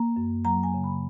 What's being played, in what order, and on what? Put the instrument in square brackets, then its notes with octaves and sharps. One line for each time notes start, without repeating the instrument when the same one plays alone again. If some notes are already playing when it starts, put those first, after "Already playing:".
Already playing: [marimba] A#3 A#5
F#2
F#3 A#5
G#5
C#3
B5